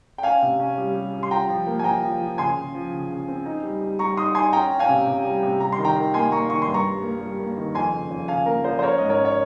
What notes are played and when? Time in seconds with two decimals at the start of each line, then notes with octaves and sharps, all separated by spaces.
0.18 G5
0.23 C#4 F5 G#5
0.42 C3
0.60 C#4
0.78 G3
0.95 G3
1.14 G3
1.23 C6
1.31 F4 G5 A#5
1.49 F3
1.67 A#3
1.79 G#5
1.84 F3 G5 A#5
2.03 F3
2.21 F3
2.38 C#3 G#5 C6
2.57 C#3
2.74 F3
2.92 C#3
3.10 C#3
3.28 C4
3.46 D#4
3.63 G3
3.81 G3
3.99 G3 A#5 C#6
4.17 D#4 C6 D#6
4.35 D#4 G#5 C6
4.53 C#4 G5 A#5
4.71 C#4
4.79 F5 G#5
4.89 C3
5.07 C3
5.25 G3
5.43 C3
5.60 G3 A#5
5.72 C6
5.79 D#3
5.84 G5 A#5
5.96 D#3
6.14 A#3 G#5 C6
6.31 A#3 A#5 C#6
6.50 D#3 C#6
6.62 C6
6.68 G2
6.74 A#5 C#6
6.85 G3
7.03 A#3
7.21 G3
7.39 A#3
7.57 D#3
7.75 F2 G#5 C6
7.93 C#3
8.10 F2
8.28 C#3 F5 G#5
8.46 A#3 A#4
8.64 F3 C5
8.79 C5
8.82 C#4 A#4 C#5
8.98 G#2 D#5
9.09 A#4 C#5
9.18 C#4
9.25 C#5